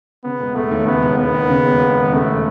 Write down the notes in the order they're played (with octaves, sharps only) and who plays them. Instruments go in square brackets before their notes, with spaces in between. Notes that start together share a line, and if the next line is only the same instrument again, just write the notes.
[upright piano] C#3 [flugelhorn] B3
[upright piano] E1
[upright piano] E1 [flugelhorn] A3
[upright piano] D#2
[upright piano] C#3 [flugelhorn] B3
[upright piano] E1
[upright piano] E1 [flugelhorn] B3
[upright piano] D#2
C#3
E1
E1
D#2
[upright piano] C#3 [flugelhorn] A3